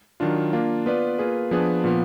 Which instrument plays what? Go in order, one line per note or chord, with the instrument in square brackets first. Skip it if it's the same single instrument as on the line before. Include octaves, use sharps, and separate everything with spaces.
[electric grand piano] D#3 F#3 D4 F4
A#3 D4 F4
B3 F4 B4 D5
A#3 F4 G#4 B4
F3 B3 D4 G#4 B4
A#2 F3 B3